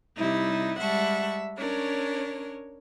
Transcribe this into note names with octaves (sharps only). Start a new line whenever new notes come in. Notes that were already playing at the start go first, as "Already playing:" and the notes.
C3 G3 D#4 E4
G3 G#3 E5 F#5 A5 C#6
C#4 D4 A#4 C#5